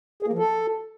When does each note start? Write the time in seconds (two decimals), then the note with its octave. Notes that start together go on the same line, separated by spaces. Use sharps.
0.23 G#4
0.28 A#3
0.33 F3
0.38 A4